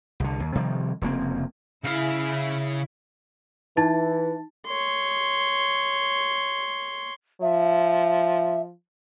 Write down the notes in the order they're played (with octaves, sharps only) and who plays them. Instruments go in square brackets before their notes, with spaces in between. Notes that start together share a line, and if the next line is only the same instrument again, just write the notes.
[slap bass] C2 D3
D#2
C3 D#3 F3 G3
F1 C#3 A#3 C4
[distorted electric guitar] C#3 F5 [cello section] E4
[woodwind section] E3 [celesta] D#4 A5 A6
[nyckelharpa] C#5 C6
[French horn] F3 [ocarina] E5